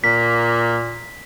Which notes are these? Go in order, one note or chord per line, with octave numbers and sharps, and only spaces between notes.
A#2 A#3 B6